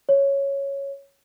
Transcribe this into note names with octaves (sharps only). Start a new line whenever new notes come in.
C#5